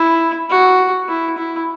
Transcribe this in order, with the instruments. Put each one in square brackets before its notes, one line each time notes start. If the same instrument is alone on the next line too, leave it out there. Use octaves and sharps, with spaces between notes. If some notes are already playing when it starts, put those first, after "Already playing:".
Already playing: [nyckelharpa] E4
F#4
E4
E4